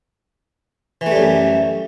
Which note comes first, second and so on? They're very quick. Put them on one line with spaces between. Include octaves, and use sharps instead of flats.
E3 A3 G3 F#2